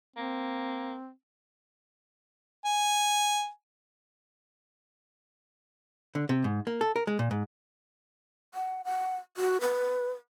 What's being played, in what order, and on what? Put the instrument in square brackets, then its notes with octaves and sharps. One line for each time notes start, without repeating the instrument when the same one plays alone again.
[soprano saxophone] A#3 [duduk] C4
[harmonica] G#5
[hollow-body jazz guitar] D3
C3
G#2
A#3
A4
A#4
G#3
A#2
G#2
[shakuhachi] F#5
F#5
F#4
B4